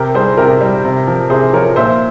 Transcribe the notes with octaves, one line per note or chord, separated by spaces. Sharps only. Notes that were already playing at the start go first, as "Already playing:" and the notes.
Already playing: C3 G4 A#4
G3 G#4 C5
C3 G4 A#4
G3
C3
F3
C3 G#4 C5
F3 A#4 C#5
A#2 C5 E5